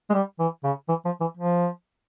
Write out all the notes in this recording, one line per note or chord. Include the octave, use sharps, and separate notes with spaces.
G#3
G3
E3
C#3
E3
F3
E3
F3